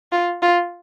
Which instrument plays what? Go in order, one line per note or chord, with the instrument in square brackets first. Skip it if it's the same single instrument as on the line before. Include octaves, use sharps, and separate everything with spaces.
[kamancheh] F4
F4